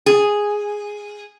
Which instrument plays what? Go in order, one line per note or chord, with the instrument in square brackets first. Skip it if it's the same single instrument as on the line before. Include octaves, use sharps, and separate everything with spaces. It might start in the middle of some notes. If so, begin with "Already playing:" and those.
[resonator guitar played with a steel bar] G#4